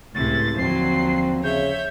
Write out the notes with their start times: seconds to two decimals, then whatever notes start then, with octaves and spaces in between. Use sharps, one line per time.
0.15 C#2 A2 C3 E4 A6
0.58 D#2 D3 F3 F#3 C4 C7
1.44 C#3 C#5 E5 G6